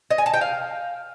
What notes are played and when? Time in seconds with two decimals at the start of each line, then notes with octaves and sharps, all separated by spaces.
0.11 D#5
0.18 G#5
0.26 A5
0.34 G5
0.41 F5